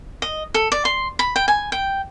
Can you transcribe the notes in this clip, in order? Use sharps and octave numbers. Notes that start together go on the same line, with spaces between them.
D#5
A4
D5
C6
B5
G5
G#5
G5